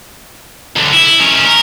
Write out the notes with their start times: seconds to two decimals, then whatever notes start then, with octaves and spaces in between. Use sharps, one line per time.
0.76 C#2 D3
0.93 E4
1.20 D#3 C#4
1.45 A#4